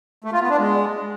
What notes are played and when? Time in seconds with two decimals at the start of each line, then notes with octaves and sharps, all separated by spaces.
0.24 A3
0.33 F4
0.41 B3
0.50 D4
0.58 G#3